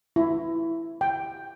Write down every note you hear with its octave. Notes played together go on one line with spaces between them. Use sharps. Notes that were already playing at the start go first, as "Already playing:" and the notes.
E4
G5